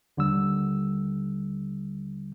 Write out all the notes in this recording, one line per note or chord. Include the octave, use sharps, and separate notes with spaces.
D#2 D3 G3 E6